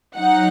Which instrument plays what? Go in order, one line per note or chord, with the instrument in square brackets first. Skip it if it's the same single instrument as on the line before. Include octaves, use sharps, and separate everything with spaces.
[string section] F#3 D#4 F#5